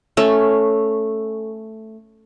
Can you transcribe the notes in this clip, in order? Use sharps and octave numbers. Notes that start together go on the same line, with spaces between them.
A3 C#4 A4